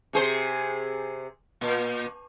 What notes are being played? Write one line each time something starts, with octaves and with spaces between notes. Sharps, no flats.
C3 G#4 C5
A#2